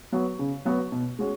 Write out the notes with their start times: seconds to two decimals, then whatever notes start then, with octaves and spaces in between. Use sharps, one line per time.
0.12 F#3 B3 F#4
0.39 C#3
0.65 F#3 B3 F#4
0.92 B2
1.19 G#3 C#4 F#4